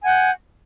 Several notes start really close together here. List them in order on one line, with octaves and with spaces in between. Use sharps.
G#5 F#5 G6